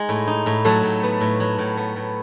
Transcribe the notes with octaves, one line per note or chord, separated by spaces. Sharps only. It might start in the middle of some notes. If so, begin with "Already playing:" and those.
Already playing: G#3 D#4
A2
D#4
A2
F#3 A3 A4
A2
B3
A2
F#3
A2
B3
A2